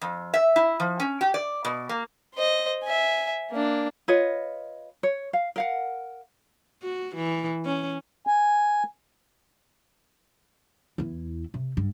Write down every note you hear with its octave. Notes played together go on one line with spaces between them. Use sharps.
F2
E5
E4
F3
C#4
G4
D5
B2
A#3
C5 D#5
E5 G#5
A#3 D4
F4 B4 C#5 D#5
C#5
F5
A#4 F5 F#5
F#4
E3
C#4
G#5
E2 E4
C3
G2